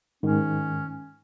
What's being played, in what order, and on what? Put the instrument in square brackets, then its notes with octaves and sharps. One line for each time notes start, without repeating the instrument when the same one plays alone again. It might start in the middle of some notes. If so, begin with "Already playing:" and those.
[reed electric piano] G#2 D#3 [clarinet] C#4